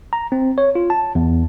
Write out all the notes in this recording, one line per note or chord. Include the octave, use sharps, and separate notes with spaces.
A#5
C4
C#5
F4
A5
E2